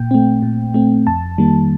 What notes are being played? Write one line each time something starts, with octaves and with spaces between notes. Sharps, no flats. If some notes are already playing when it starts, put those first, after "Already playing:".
Already playing: A#2 G5
A3 C4
A#2
A3 C4
F2 A5
D#3 G3 A#3